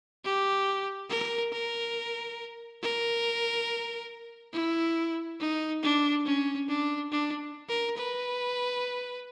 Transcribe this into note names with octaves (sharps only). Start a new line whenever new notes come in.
G4
A#4
A#4
A#4
E4
D#4
D4
C#4
D4
D4
A#4
B4